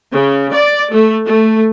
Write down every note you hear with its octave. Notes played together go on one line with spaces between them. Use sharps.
C#3
D5
A3
A3